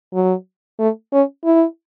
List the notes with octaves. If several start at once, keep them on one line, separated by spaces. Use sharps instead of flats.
F#3
A3
C#4
E4